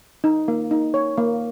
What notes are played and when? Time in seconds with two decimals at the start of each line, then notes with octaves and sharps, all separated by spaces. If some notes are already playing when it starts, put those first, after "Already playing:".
0.24 D#4
0.48 A#3
0.71 D#4
0.94 C#5
1.17 A#3